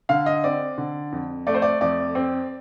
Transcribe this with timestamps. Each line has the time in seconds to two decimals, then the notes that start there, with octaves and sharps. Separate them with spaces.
0.09 D3 F5
0.26 D#5
0.44 C4 D5
0.78 D3
1.12 F2
1.47 A3 D5
1.54 C5
1.62 D5
1.81 F2 D5
2.15 C4